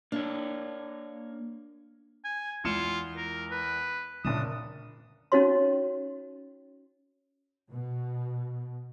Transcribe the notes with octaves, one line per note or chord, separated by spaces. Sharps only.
A#3 D4 C#5
G#5
E2 G#3 F4 C#7 E7
A#4
B4
F#1 A#2 D4 D#6 E7
C#4 D#4 F#4 C#5 C6
B2